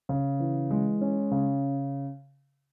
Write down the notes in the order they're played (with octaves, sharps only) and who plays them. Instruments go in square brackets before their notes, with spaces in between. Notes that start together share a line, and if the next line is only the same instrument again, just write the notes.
[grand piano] C#3
E3
G#3
C#4
C#3